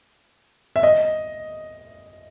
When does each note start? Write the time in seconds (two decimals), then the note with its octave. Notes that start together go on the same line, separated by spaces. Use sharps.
0.76 E5
0.83 D#5